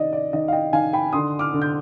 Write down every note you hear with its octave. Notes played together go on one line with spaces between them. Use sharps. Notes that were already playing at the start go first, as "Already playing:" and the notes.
Already playing: D#3 D5 D#5
D5
D#3 D#5
F5
D#5 G5
D#3 F5 G#5
G5 B5
D3 C6 D#6
D6 F6
D3
G6